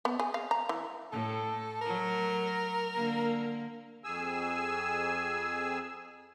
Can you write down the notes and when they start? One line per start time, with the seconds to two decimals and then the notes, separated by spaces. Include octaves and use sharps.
0.05 B3
0.19 G#4
0.34 F5
0.51 A#5
0.69 E3
1.12 A2 A4
1.81 F#3 A3 A#4
2.95 D3 A#3
4.04 F2 G#4 G#5 E6